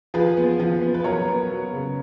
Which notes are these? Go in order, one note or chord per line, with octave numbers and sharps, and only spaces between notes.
F3 G#4 B4
B3
F3
B3
B4
F#3 A#4 C#5
B3
F#3
C#3